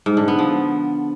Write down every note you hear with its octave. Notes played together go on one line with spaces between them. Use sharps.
G#2
D3
B3
F3